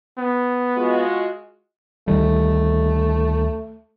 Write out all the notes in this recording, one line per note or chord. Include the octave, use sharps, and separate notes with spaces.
B3
G#3 F4 F#4
D2 D#3 G3 A3